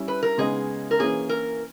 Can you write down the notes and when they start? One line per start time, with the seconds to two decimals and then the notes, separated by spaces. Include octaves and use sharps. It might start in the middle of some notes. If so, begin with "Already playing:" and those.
Already playing: G3 C#4 E4
0.08 B4
0.23 A#4
0.38 C#3 G#3 B3 D#4 G#4
0.91 A#4
0.99 E3 A#3 C#4 G#4
1.29 A#4